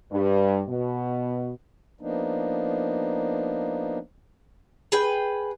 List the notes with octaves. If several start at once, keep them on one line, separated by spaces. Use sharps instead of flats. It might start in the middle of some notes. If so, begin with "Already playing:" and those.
G2
B2
F3 A#3 B3 D4 D#4
G#4 B4 G5